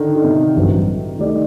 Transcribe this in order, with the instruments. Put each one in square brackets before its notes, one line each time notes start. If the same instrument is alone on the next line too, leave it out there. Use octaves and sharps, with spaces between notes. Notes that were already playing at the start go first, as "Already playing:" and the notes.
Already playing: [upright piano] D3 D#3
D3
C3
[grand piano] A1 G2 F#3 C4 [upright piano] D3
[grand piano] D#3 A3 D#4 G4 D5